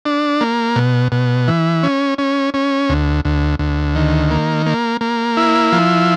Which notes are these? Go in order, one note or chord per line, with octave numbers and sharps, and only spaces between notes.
D4
A#3
B2
B2
E3
C#4
C#4
C#4
D2
D2
D2
D#3
A#3
A#3
A#3
E4
F3